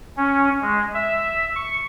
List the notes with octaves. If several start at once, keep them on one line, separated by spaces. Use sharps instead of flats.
C#4
G#3
E5
C#6